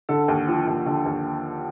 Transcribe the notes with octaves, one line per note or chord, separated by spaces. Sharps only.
D3 A4
D#2
F3
D#2
D3
D#2